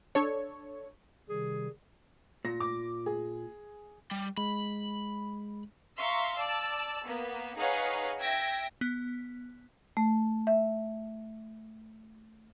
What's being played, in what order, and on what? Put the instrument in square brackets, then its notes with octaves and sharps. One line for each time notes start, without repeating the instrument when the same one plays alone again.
[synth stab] D4 A4 C#5
[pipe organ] C3 D#3 G3 [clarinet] G#4
[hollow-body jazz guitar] A#2 [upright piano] A#6
[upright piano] D6
G#4
[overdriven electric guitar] G3
[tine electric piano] G#3 [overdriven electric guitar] B5
[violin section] E5 F5 A#5 C6 C#6
D5 A5 E6
A#3 B3
D#4 G#4 B4 C#5 F5 F#5
E5 G5 G#6 A#6 D7
[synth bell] B3
[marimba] A3
E5